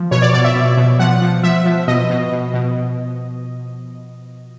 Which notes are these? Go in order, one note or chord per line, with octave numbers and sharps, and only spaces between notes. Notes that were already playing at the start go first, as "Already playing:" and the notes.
Already playing: F3
B2 C#5
D5
B2 D5
E5
B2
B2
F3 F#5
F3
F3 E5
F3
B2 D#5
B2
B2
B2